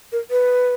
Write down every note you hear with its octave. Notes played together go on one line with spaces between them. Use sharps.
A#4
B4